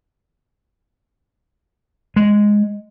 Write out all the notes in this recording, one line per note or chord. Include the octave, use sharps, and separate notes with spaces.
G#3